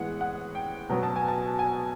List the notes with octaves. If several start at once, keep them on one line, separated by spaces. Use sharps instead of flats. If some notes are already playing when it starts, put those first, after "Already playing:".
Already playing: A2 E3 G#3 B3 F#5
F#5
G5
B2 F#3 B3 A#5
A5
G#5
A5
G#5